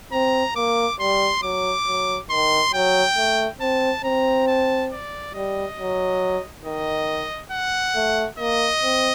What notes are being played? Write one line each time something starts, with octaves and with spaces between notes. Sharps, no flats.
C4 A#5
A#3 D6
G3 C6
F#3 D6
F#3
D#3 C6
F#3 G5
A3
C4 A5
C4 A#5
A5
D5
G3 D#5
F#3
D#3 D#5
F#5
A3
A#3 D#5
C4